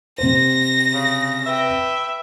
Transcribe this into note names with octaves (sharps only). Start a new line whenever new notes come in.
C3 C5 A#6
C#3
B4 E5 G5